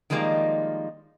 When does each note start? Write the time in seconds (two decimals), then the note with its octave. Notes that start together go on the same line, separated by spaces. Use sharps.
0.10 D#3 F3 G3 G#3 A#3 D#4